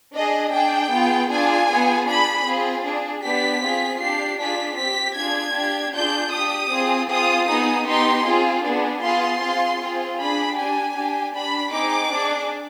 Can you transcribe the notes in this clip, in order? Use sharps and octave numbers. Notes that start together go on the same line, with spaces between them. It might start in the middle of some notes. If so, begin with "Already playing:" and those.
D4 G#4 D#5
D4 G#4 G5
B3 F4 G#4
D4 F4 G#4 G#5
B3 F4 G#4
D4 G#4 B5
C4 F4 G#4
D4 G#4
B3 D4 G4 B6
C4 F4 G#4
D4 G4 C7
D4 F4 G#4 B6
C4 G4 B6
D4 F4 G#4 G#6
D4 G4
D4 F4 G#4 G6
D4 G4 D#6
C4 F4 G#4
C4 F4 G#4 D#6
B3 D#4 G#4 D#6
B3 D#4 G4 C6
C4 F4 G#4
B3 D4 G#4
B3 F4 G#4 C6
C4 F4 G#4
C4 F4 G#4
D4 G#4 B5
D4 G4 G#5
D4 G4
D4 G4 B5
C4 D#4 G#4 D6
D4 G#4